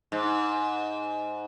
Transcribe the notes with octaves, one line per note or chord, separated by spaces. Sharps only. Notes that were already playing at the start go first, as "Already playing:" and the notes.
G#2